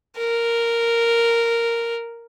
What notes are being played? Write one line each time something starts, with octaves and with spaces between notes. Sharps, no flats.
A#4